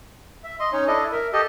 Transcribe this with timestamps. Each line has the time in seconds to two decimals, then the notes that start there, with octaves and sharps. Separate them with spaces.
0.44 E5
0.60 D#5 C6
0.73 C#4 D#4 C#5
0.87 D4 E4 A4 D#5
1.12 A#4 E5
1.33 G4 A4 D#5